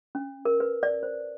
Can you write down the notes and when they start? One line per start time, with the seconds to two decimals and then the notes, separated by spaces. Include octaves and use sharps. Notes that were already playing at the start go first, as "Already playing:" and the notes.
0.15 C#4
0.45 A#4
0.60 B4
0.83 D5
1.03 C5